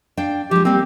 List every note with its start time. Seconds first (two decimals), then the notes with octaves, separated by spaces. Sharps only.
0.17 D4 F5 G5
0.51 F3 G#3 G4
0.65 G3 A#3 C4